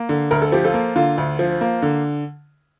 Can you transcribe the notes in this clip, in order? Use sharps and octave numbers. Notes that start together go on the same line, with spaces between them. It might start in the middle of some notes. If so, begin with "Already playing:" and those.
Already playing: A#3
D3
D2 A#4
A4
F3 G4
F4 A4
A#3
D3 F4
D2
F3
A#3
D3